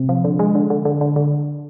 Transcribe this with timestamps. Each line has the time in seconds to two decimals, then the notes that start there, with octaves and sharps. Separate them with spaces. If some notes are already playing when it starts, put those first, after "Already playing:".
Already playing: C3
0.09 F3
0.24 D3
0.39 G#3
0.55 D3
0.70 D3
0.85 D3
1.01 D3
1.16 D3